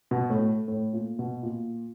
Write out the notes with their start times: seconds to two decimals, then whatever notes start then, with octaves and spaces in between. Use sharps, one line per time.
0.11 B2
0.30 A2
0.68 A2
0.93 A#2
1.19 B2
1.43 A#2